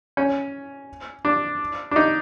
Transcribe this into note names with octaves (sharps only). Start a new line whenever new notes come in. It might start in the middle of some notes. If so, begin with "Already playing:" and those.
C#4
D4
D4
D#4